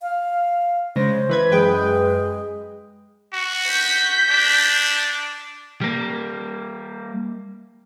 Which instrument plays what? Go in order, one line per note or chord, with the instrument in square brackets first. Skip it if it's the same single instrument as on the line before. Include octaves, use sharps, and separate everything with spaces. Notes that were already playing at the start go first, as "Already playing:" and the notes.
[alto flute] F5
[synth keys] C#3 G#3 A#6 [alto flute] C5
[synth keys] E3 B4 G#6
[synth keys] F#2 B4 G5 [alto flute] G#3
[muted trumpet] F#4
[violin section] G6 B6
[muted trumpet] D4
[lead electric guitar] G3 A#3